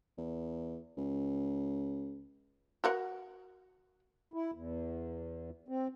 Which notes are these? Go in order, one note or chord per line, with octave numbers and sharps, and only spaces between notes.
E2
C#2
F#4 A#4 F#5
E4
E2
C4